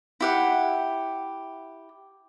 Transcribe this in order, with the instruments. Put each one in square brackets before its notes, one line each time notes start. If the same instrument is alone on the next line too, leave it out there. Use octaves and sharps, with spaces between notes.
[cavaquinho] E4 G4 F#5